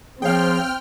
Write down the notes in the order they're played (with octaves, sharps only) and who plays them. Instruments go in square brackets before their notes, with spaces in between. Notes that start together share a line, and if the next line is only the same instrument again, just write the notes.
[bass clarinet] F3 [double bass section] C4 [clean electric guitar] G#4 C#5 F5 [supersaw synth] G5 F6